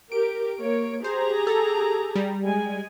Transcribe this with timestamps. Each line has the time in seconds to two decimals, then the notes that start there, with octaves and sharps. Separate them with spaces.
0.12 G4 A#4 D7
0.60 A#3 C#5
1.04 G4 G#4 C5 A#5
1.47 A4
2.15 G3
2.44 G#3 G#5